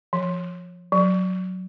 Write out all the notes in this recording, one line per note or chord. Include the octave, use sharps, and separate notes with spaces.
F3
F#3